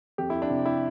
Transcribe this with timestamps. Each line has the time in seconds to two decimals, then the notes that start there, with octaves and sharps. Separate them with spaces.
0.18 F2 G4
0.30 E4
0.42 D4
0.50 C3
0.66 E4